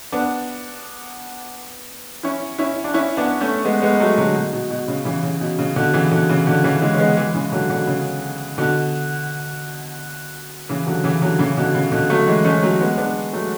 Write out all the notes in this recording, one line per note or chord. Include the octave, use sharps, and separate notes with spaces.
B3 D4
C#4 E4
C#4 E4
D4
C#4 E4
B3 D4
A3 C#4
G#3 B3
G#3 B3
F#3 A3
D3 F#3
B2
B2
B2
C#3
C#3 E3
C#3
B2
C#3
B2 D3
C#3 E3
B2 D3
C#3 E3
B2 D3
C#3 E3
E3 G#3
C#4
G#3 B3
E3 G#3
C#3 E3
D3 F#3
B2 D3
C#3
B2 D3
C#3 E3
D3 F#3
C#3 E3
D3 F#3
C#3 E3
B2 D3
C#3
B2 D3
F#3 A3
E3 G#3
A3 C#4
F#3 A3
G#3 B3
B3 D4
F#3 A3